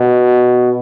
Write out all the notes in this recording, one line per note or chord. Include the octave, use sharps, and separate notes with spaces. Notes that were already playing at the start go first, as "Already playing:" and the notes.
Already playing: B2